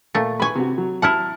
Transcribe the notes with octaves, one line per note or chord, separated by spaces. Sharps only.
A#2 A3
B4 G#5 B5 C#6
C3 F#4
F#3
E4 F#5 A5 F6